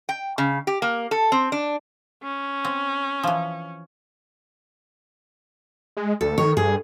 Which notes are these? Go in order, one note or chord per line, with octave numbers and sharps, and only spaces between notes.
G5
C#3
G4
A#3
A4
C4
D4
C#4
C4
E3 F3
G#3
D2 A4
D#3 C#5
G2 G#4